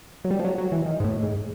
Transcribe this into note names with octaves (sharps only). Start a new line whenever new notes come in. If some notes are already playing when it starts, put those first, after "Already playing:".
F#3
G3
F3
F#3
F#3
E3
D#3
G#2
A2
G#2